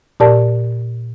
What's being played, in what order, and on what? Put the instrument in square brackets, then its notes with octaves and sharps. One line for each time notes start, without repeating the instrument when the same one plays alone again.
[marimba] A#2 G4 A#4 D5 A5